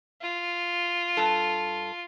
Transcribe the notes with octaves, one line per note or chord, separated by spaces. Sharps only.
F4
G2 A4